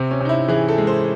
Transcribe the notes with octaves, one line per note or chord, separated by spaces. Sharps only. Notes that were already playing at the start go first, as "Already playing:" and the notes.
Already playing: C3 C4
C#4
C3 D#4
E4
E3 G#4
A4
G#3
C5